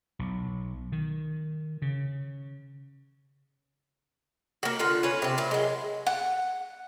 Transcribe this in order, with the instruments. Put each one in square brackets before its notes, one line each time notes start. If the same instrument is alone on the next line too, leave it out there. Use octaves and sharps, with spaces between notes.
[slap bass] B1
D#3
C#3
[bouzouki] A#3 F#4
D3 F4 F#5
C#4 B4
C3 C4
A#2 E4
F#3 G#3
[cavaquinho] F#5